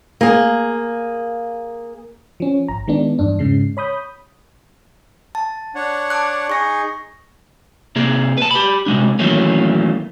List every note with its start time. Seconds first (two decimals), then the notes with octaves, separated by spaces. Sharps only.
0.21 A#3 G#4
2.40 F3 C#4
2.68 G#1 A#5
2.87 D#3 G#3 B3 D4
3.19 E2 G2 D4
3.39 G#2 C#3 G#3 C7
3.77 C#5 B5 D#6 G6
5.35 A5
5.75 D4 C#5 F#5
6.10 A5 D6 F#6
6.50 D#4 G#4 C#6 A#6
7.96 C3 A#3 G#4
8.38 B4 A5
8.51 G4 B5
8.86 C3 G#3 D4
9.19 D#3 E3 F#3 A3 A#3 C#4